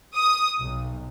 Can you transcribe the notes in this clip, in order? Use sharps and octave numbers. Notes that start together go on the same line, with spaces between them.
D#6
B1